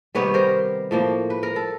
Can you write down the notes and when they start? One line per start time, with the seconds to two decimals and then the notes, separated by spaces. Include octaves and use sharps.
0.15 C3 D#3 G3 B3 B4 C#5
0.34 A#4 C5
0.91 A2 F3 A#3
1.30 B4
1.43 A#4
1.56 A4